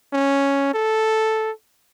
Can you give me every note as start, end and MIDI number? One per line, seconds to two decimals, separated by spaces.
0.13 0.72 61
0.74 1.51 69